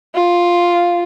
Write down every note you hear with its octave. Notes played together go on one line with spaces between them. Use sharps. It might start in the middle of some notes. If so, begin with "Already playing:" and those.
F4